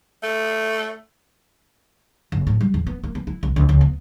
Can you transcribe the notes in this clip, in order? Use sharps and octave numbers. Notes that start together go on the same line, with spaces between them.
A3
F#1
A2
G3
E2
B3
A#3
B3
E4
C2
C#2
C#2
B3